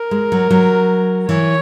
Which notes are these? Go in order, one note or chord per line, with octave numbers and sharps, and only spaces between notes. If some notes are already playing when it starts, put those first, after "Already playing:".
Already playing: A#4
G#3
F#3
F#3
E3 C#5